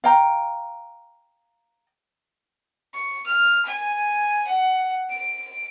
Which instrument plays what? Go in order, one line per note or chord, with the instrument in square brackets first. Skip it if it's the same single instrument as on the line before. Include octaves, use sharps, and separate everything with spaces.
[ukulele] F5 G5 A#5
[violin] C#6
F6
G#5
F#5
D7